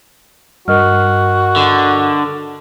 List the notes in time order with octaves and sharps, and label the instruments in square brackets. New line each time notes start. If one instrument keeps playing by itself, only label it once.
[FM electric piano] G2 [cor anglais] F#4 [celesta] A#4 D#5 F6
[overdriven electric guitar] D3